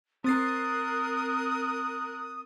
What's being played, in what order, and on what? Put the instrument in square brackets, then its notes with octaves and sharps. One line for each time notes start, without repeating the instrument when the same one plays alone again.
[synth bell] C4 A6 C7 [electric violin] A#4 F#6 [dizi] D#6